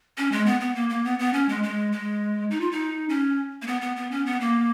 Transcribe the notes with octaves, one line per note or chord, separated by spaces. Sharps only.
C#4
G#3
B3
B3
A#3
A#3
B3
B3
C#4
G#3
G#3
G#3
D#4
F4
D#4
C#4
A#3
B3
B3
B3
C#4
B3
A#3